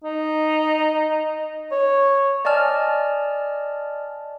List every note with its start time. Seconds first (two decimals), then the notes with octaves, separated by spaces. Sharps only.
0.04 D#4
1.71 C#5
2.45 D5 D#5 G#5 A5 F6